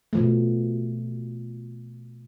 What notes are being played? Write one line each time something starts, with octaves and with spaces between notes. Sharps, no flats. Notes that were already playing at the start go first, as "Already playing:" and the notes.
B2 F3 A3